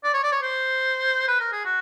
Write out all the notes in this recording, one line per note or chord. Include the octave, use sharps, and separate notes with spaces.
D5
C#5
D5
C#5
C5
B4
A#4
G#4
F#4